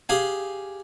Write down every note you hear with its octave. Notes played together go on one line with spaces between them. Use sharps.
G4 G#4 F5 G#5